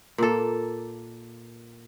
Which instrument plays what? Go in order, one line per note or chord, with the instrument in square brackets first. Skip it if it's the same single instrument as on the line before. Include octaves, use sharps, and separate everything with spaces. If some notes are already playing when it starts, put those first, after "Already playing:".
[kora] A#2 A#3 A4